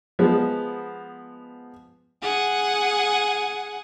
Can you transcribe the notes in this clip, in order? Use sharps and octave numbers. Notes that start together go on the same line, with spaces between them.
F3 G#3 B3
G#4 F#5